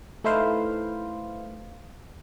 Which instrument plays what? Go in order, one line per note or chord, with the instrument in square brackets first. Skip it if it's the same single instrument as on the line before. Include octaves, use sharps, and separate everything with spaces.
[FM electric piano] A3 D#4 E4 B4 C5 F5